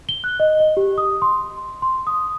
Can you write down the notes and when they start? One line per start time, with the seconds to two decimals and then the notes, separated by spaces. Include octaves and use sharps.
0.09 G7
0.24 F#6
0.40 D#5
0.60 D#5
0.77 G4
0.98 D#6
1.22 C6
1.82 C6
2.07 D#6